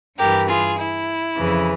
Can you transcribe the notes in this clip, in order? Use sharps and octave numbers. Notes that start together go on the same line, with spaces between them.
G2 E3 G4 A#4
F4 G#4
E4
F2 C#3 E3